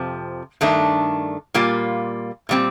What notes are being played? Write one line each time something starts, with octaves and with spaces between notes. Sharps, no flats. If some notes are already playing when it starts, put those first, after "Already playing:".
Already playing: F2 C3 F3
G2 D#3 A3 D4
A#2 G3 A#3 F4
A#2 G3 C4